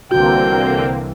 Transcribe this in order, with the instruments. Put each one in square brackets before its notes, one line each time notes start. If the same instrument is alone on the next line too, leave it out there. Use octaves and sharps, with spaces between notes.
[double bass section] C2 E3 [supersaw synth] D3 A#3 C4 [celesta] F#4 [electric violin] G5 G6